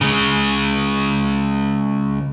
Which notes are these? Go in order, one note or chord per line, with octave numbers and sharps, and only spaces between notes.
C#3 G#3